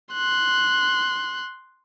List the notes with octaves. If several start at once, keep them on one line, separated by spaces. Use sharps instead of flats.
C6 F#6